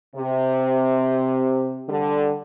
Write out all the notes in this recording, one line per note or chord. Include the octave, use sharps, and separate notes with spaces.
C3
D3 G3